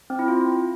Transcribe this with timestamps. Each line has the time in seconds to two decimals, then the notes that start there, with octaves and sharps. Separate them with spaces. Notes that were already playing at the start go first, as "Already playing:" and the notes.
0.10 C4
0.19 E4
0.28 F4